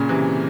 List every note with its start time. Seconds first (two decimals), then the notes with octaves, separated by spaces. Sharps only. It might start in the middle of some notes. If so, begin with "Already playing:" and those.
Already playing: A#2 C#3
0.09 C3 E3